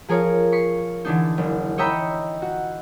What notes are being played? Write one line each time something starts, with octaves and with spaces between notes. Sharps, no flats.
F3 G#4 A#4 C#5 F5
C#6 B6 C7
D3 E3 D4 D#4
F#1
C#5 D#5 E5 G5 A#5 B5
F#4